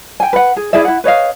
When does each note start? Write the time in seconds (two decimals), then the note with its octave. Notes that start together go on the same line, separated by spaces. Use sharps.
0.20 G5 G#5
0.33 B4 F#5
0.56 G#4
0.73 E4 G#4 D5 E5
0.85 E4 F#5
1.04 B4 C#5 D#5 F5